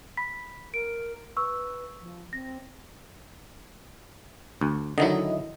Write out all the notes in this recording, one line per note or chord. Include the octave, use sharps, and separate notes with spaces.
B5 B6
A#4 D7
B4 C#6 E6
F3
C4 A#6
D2
D3 D#3 F#3 E4 D#5